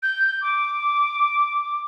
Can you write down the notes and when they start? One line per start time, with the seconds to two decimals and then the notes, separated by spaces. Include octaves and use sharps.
0.03 G6
0.42 D6